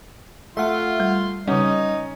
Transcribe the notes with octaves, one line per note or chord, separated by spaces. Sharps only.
A3 F4 E5 F#5 C6
G3
C#3 G3 C#4 D#4 D#5 F#5